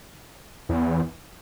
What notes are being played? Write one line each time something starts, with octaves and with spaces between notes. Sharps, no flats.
E2